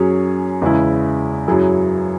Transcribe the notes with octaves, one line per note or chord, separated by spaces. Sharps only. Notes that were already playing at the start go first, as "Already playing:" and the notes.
Already playing: F#2 F#3 C#4 G#4 C#5
E2 C#3 G#3 E4
F#2 F#3 E4 G#4